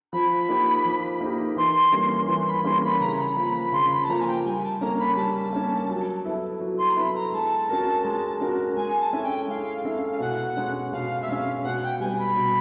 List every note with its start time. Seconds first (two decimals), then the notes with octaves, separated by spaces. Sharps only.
0.13 F3 B5
0.49 A#3 D#4 G4
0.85 F3
1.21 A#3 D#4 G4
1.57 E3 C6
1.92 G3 A#3 C#4
2.28 E3 C6
2.47 B5
2.65 G3 A#3 C#4 C6
2.83 B5
3.00 C#3 A#5
3.19 B5
3.36 F3 A#3 B5
3.50 A#5
3.54 B5
3.72 C#3 C6
3.91 B5
4.04 A5
4.08 F3 A#3 A#5
4.20 G#5
4.27 G5
4.45 G3 G#5
4.63 A5
4.80 A#3 C#4 A#5
4.99 B5
5.16 G3 A5
5.53 A#3 C#4
5.89 F#3
6.25 B3 E4 A4
6.61 F#3
6.78 C6
6.90 A#5
6.96 B3 E4 A4 B5
7.15 A#5
7.33 G#3 A5
7.69 C#4 F#4 A#4
8.05 G#3
8.41 C#4 F#4 A#4
8.76 G#3 G#5
9.00 A5
9.12 C#4 E4 A4 G#5
9.24 G5
9.48 G#3 F5
9.85 C#4 E4 A4
10.12 F5
10.20 B2 F#5
10.57 G#3 C#4
10.92 B2 F5
11.22 E5
11.28 G#3 C#4 F5
11.64 B2 F#5
11.83 G5
12.00 G3 B3 G#5
12.18 B5
12.36 B2